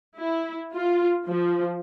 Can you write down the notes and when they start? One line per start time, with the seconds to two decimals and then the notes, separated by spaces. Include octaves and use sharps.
0.18 E4
0.74 F4
1.27 F3